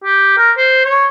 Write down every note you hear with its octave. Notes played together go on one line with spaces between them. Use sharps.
G4
A#4
C5
C#5